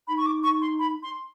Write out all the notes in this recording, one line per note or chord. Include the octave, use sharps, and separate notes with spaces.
D#4 B5
C#6
D6
C#6
C6
B5
C6